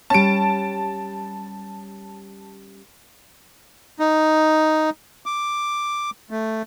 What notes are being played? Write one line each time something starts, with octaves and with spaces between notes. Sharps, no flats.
G3 C#4 A5 D7
D#4
D6
A3